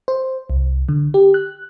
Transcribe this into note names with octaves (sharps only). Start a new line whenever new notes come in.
C5
C2
D3
G4
F#6